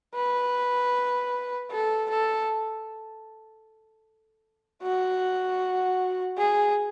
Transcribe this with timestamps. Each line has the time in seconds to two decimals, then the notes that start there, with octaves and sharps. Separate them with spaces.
0.15 B4
1.71 A4
2.10 A4
4.82 F#4
6.37 G#4